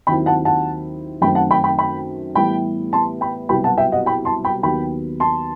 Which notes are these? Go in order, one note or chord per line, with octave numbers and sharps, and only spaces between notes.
D#2 D#3 F#3 C4 E4 G5 B5
F#5 A5
F#5 A5
F#2 D#3 A3 C4 G5 B5
F#5 A5
G5 B5
G5 B5
G5 B5
A2 E3 G3 B3 E4 G5 B5
A5 C6
G5 B5
C2 B2 F#3 B3 E4 G5 B5
F#5 A5
E5 G5
D#5 F#5
G5 B5
A5 C6
G5 B5
D#2 D#3 F#3 B3 G5 B5
A5 C6